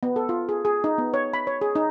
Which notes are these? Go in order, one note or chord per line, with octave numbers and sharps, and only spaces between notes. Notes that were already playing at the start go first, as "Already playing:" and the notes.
B3
A4
F4
G#4
G#4
D#4
B3
C#5
B5
C#5
G#4
D#4